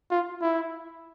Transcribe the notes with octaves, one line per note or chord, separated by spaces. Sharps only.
F4
E4